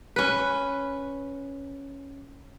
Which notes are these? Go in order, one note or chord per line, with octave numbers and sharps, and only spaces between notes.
C#4 B4